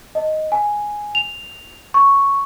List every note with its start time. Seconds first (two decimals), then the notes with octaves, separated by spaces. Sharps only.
0.15 D#5
0.52 G#5
1.15 F7
1.94 C#6